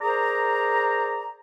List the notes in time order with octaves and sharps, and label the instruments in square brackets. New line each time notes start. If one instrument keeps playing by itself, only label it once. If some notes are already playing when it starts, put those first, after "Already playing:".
[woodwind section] G#4 A#4 C5 D5 A#5